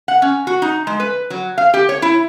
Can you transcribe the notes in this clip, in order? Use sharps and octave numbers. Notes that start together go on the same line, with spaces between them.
F#5
C#4
F#4
D#4
G#3
B4
F#3
F5
G4
C#5
E4